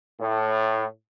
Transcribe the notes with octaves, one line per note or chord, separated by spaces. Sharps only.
A2